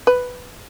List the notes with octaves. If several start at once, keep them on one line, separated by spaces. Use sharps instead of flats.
B4